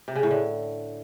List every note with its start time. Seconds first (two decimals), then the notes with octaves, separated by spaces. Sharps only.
0.08 C3
0.15 C#3
0.23 A2
0.31 D3